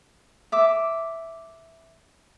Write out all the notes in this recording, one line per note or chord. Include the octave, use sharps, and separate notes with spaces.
E5 D6